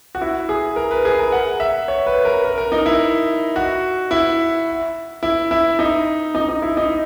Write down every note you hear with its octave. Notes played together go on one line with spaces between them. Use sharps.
F#4
E4
G#4
A#4
B4
G#4
A#4
F#5
E5
C#5
B4
A#4
A#4
A#4
D#4
E4
F#4
E4
E4
E4
D#4
D#4
D#4
E4
D#4